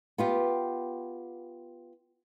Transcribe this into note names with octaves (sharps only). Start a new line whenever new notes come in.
B3 F4 G4